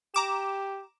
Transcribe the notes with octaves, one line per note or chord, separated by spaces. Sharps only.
G4 A#5 D6 E7